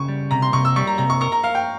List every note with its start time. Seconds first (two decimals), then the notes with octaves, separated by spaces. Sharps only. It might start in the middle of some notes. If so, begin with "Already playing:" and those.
Already playing: C#3 C#6
0.08 G3
0.31 C3 A#5
0.42 C6
0.53 C3 C#6
0.65 E6
0.76 G3 C#6
0.87 A#5
0.98 C3 A#5
1.10 C#6
1.21 A#4 C#6
1.32 A#5
1.44 A#4 F5
1.55 G5